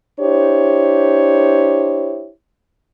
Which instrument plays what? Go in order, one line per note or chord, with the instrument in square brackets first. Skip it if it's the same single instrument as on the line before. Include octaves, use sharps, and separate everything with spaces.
[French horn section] D4 E4 G4 C5 C#5